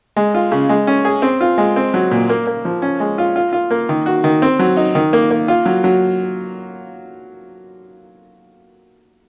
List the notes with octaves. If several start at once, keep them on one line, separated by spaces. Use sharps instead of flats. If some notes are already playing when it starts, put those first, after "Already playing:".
G#3
F4
C#3
G#3
C#4
G#4
C4
F4
G#3
C4
F#3
A#2
A#3
A#3
F3
C#4
G#3
F4
F4
F4
A#3
D#3
F#4
D#3
C4
F#3
D#4
D#3
A#3
A#3
F4
F#3
F#3